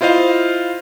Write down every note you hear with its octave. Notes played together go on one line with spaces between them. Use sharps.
E4 F4 C5 D#5 F5